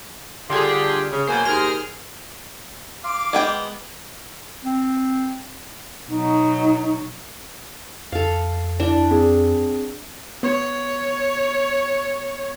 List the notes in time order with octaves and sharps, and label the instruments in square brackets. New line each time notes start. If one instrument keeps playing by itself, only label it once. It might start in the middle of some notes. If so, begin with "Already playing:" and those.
[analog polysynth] D3 G#4 [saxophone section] G3 F4 G4 [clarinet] C6
[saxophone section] C#3 [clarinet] C#4
[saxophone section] B2 F#3 A#3 [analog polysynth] C5 [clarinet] G#5
[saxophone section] D#2 A#4 C5 [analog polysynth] G#4 F6
[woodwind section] F5 C6 D6
[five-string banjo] G#3 B3 G5
[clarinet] C4
[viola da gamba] B2 F#3 [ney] D#4
[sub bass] F2 [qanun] A4 F5
[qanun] D4 [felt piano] E4 D5
[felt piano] C4 G#4
[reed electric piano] B3 [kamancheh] C#5